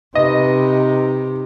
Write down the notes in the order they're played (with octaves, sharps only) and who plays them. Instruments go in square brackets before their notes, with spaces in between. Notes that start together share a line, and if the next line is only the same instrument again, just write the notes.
[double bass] C3 [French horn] D#4 [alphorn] B4 [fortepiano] D#5